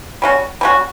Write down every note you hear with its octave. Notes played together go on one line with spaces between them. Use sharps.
G3 C#4 F#4
G3 C#4 F#4